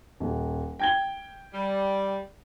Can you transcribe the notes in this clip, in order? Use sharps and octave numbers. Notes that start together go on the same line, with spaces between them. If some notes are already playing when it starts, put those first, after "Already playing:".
D#1
G5 G#6 G7
G3